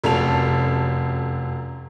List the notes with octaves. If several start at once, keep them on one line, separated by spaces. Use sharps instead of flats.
F1 F#2 A4 F7